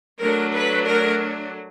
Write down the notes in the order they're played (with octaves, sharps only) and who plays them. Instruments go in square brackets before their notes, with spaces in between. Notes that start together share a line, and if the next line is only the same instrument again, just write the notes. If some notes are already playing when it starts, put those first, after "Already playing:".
[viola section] F#3 A3 D4 A#4
B4
A#4